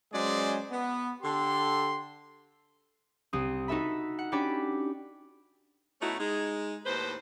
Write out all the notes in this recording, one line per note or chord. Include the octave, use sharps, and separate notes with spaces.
F#3 G#3 C#4 G#4 C5 D5
B3
D3 G4 A4 C6
C2 C4 D#6
D#4 F#4 A4 E5 B5
F#5
C#4 D4 F#4 G4 D5 B5
B2 A3 C#4 D#4 E4 F#4
G#3 D#4
D#2 A2 B4 C5